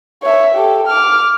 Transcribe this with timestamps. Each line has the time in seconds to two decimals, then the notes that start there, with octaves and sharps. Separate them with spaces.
0.23 C#5 E5
0.55 G4 A4
0.87 D6 F6